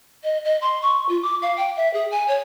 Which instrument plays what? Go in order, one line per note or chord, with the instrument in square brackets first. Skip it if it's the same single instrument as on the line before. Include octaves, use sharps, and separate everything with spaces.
[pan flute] D#5
D#5
C6
C#6
F4
D6
F5
G5
E5
G#4
G#5
C#5